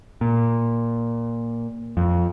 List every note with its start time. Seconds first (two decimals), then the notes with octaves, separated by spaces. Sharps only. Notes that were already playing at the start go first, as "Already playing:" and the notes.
0.21 A#2
1.97 F2